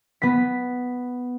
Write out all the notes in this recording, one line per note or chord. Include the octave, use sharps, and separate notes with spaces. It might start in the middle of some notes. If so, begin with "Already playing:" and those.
B3 B6